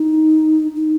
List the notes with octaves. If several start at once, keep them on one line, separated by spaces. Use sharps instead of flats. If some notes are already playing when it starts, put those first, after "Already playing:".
Already playing: D#4
D#4